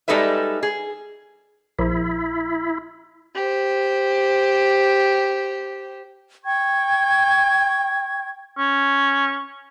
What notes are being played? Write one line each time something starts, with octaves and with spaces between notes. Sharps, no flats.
G3 G#3 D#4 A4 B4 E5
G#4
A#1 E4
G4 C5
G5 C#6 G#6
C#4